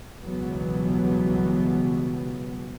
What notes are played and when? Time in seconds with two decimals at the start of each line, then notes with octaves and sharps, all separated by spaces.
0.22 C#2 B2 E3 F#3 G3 B3